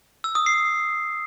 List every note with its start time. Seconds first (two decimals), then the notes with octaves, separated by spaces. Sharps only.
0.24 E6
0.35 D#6
0.46 C7